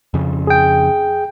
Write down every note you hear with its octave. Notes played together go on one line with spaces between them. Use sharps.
F2 C#3
G#4 G5